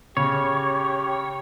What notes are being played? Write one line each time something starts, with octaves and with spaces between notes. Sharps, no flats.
C#3 G4 C#5